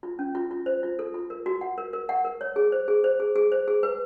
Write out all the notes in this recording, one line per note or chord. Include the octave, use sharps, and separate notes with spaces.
F4
C#4
F4
F4
C5
F4
A4
F4
A#4
F#4
F#5
A#4
A#4
F#5
A#4
C#5
G#4
C5
G#4
C5
G#4
G#4
C5
G#4
B4